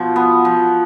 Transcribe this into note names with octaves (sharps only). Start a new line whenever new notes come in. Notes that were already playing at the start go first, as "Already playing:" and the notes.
Already playing: B2 F3
B3
F3